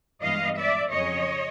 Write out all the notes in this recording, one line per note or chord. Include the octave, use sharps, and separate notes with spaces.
G2 E3 G#3 B3 D#5 F5
D5 E5
F2 C#3 F#3 C#5 D#5